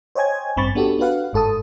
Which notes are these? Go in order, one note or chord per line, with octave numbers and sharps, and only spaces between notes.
C5 C#5 D#5 G5 G#5 G#6
A1 G2 C4 B5 C#6 A6
B3 D4 F#4 G4 A4
D4 F#4 B4 F5 F#5
G1 G#2 A4 A5 D#6